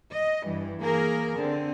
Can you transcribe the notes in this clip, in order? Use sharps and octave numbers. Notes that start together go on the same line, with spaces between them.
D#5
G2 E3
E3 A#3 G#4 A#4
D3 C4